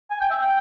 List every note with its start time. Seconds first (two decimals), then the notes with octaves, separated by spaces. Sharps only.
0.11 G#5
0.20 G5
0.31 E5
0.41 G5